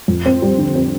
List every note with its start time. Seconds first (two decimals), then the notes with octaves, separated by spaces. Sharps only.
0.08 F2
0.26 C4
0.42 G3
0.58 D3
0.75 C4